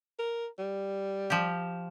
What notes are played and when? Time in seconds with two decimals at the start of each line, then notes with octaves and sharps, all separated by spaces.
0.19 A#4
0.59 G3
1.30 F3 G4